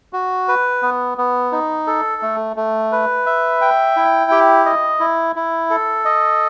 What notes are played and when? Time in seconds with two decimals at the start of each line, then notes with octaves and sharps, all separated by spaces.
0.13 F#4
0.48 B4
0.83 B3
1.18 B3
1.52 D#4
1.87 A4
2.22 A3
2.56 A3
2.92 B4
3.26 E5
3.61 G5
3.96 E4
4.31 G4
4.65 D#5
5.00 E4
5.36 E4
5.70 A4
6.05 D#5